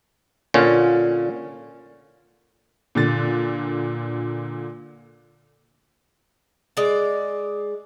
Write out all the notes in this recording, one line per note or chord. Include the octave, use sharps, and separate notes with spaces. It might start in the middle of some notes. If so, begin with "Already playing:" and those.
A#2 D3 C#4 F4
A#2 D3 A6
G#3 D5